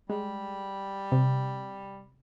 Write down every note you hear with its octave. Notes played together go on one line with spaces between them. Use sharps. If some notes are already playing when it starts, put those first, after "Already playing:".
G3 G#3
C3